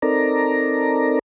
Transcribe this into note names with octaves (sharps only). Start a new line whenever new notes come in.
C4 D#4 A4 A#4 D5 A#5